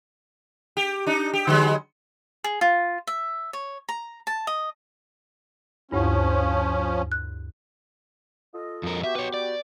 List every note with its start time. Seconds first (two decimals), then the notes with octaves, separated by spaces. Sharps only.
0.77 G4
1.06 D4 D#4
1.33 G4
1.47 D3 F#3 G#3
2.44 G#4
2.61 F4
3.07 E5
3.53 C#5
3.89 A#5
4.27 A5
4.47 D#5
5.91 D2 G2 F3 C#4 E4
7.12 F#6
8.54 F4 A4 D#5
8.83 F2 A#4
9.03 B3 F#4 G4 E5
9.15 B4 C#5
9.34 D5